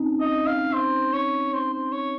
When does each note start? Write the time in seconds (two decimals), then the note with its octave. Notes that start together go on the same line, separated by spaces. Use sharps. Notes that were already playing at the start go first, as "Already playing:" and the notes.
Already playing: C4 C#4 D#4
0.20 D#5
0.47 F5
0.73 C5
1.13 C#5
1.53 C5
1.73 C5
1.92 C#5